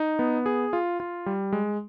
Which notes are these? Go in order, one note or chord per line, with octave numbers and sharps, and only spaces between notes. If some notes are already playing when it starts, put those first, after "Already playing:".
Already playing: D#4
B3
G#4
F4
F4
G3
G#3